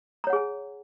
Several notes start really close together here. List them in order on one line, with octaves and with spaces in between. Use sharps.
A#5 C#5 F#5 G#4 G#5